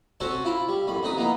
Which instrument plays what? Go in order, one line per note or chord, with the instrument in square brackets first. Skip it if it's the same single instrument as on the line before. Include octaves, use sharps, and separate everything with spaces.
[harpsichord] C4 C#4 F#4 A4 C5 C#5
E4 F4 B5
G3
A1 F#2 B5
F2 B3 D#4 B4 D#6
E3 A#3 B3 D#4